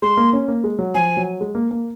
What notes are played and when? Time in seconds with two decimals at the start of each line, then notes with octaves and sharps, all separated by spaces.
0.02 G#3 C6
0.17 A#3
0.33 C#4
0.48 A#3
0.64 G#3
0.79 F#3
0.94 F3 G#5
1.17 F#3
1.41 G#3
1.55 A#3
1.71 A#3